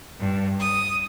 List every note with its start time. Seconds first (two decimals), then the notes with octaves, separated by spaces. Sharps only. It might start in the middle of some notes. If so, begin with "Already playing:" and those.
0.19 G2
0.59 D#6